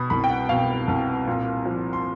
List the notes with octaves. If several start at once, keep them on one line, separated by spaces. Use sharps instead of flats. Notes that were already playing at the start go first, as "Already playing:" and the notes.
Already playing: B2 B5 D#6
C2 B5
G5
F#5
B2 F5
C2
A#2
F3
C6